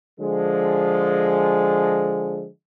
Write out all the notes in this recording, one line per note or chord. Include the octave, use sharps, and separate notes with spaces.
D3 F3 G#3